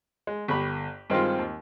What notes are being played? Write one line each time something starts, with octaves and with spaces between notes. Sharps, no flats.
G#3
G1 G4 B5 C#6
G2 D#3 G#3 C4 F4
D#2